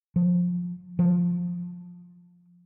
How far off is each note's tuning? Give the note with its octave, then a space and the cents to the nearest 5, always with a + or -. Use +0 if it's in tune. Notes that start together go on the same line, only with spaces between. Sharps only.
F3 +20
F3 +10